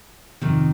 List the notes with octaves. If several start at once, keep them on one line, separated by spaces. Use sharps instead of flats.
F2 C3 D#3